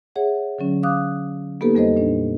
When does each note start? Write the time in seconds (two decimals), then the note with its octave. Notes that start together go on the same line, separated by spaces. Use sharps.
0.16 G#4 C#5 E5 F#5
0.59 D3 F#3 C#4
0.83 F5 D6 D#6 F#6
1.61 A#3 B3 D#4 G4 A4 B4
1.75 F2 G3 A4 C5 D#5
1.97 A#2 D4